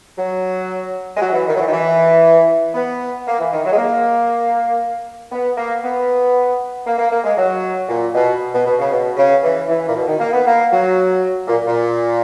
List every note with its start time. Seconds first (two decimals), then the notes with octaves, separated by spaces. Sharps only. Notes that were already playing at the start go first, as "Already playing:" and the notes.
0.18 F#3
1.16 G#3
1.21 F#3
1.33 E3
1.47 D#3
1.55 F#3
1.60 E3
1.67 D#3
1.72 E3
2.74 B3
3.27 A#3
3.39 E3
3.52 D#3
3.65 F#3
3.72 G#3
3.77 A#3
5.32 B3
5.57 A#3
5.83 B3
6.86 A#3
6.98 A#3
7.11 A#3
7.24 G#3
7.38 F#3
7.89 A#2
8.14 B2
8.53 B2
8.66 B2
8.79 C#3
8.92 B2
9.17 C#3
9.43 E3
9.69 E3
9.88 A#2
9.95 B2
10.06 D#3
10.19 A#3
10.33 B3
10.46 A#3
10.72 F#3
11.48 A#2
11.66 A#2